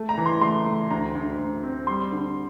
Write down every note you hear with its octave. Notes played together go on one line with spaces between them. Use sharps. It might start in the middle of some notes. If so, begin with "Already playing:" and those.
Already playing: A3
A#5
E3
C6
A3 C6
A3
D2 A#5
D2
D2
C4
G3 C6
D3